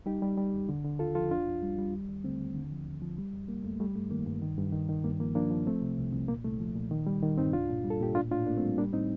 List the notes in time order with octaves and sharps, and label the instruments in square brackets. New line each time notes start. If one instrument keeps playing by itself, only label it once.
[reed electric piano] G3 D#4 G4
G3
G3
D#2
D3
D3
D#2 F4 A4
F3 F4 A4
F2 D4 F4
F2
G3
G3
D#2
D#2
D3 A3 C4
D#2
D3
F3
D#2
F3
G3
F2
G3 A#3
F2 A3
G3 A3
G2 A3
D#3 A#3
G2
D#3
G2
D#3
D#3
G2 A#3
F3 A#3
F3 A#3 D4
F3
C2 A3 C4
C3
C2
C2
A#2 A#3
C2 A3
F3
A#2
D#3
G3
D#3
G2 C4 D#4
C2 D4 F4
A#2
G3
A4
A#2 G4
A2 D4 F4
A2 D4 F4
A2 A#3 D4
A3 C4
G3
G3 A#3 D4
A2 C4 D#4